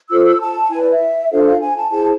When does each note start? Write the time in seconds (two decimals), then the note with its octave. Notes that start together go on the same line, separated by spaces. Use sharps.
0.10 F4 A4 C5 E6
0.26 E6
0.41 A5
0.71 E4 B4 G#5
0.81 D5
0.91 E5
1.31 D4 F4 A4 C5 F5
1.46 F5
1.61 G#5
1.77 A5
1.91 E4 G#4 C5 A5